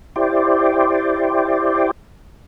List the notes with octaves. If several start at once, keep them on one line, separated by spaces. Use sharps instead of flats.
E4 G4 C5 D5